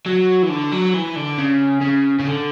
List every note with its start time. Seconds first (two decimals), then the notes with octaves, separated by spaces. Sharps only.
0.06 F#3
0.43 E3
0.49 D3
0.72 F#3
0.94 E3
1.16 D3
1.38 C#3
1.81 C#3
2.19 C#3
2.27 D3